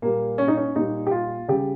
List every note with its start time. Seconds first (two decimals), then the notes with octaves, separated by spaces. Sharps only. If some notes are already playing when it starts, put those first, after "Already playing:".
0.02 A#2 G3 A#3
0.38 C#4
0.48 D#4
0.57 C#4
0.75 A#2 G3 D#4
1.07 G4
1.11 F4
1.48 C#3 G3 G4